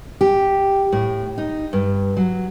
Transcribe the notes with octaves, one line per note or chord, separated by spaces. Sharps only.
G4
A2
D#4
G2
F#3